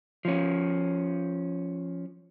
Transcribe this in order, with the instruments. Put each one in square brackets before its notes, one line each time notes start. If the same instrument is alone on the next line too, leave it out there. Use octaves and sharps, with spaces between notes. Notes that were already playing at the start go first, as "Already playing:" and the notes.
[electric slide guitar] F3 C#4